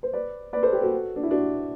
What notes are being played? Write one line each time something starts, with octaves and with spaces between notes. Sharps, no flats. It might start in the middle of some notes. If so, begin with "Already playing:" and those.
C5
B4 D5
B4 D5
A4 C5
G4 B4
F#4 A4
D4
E4
D4 F#4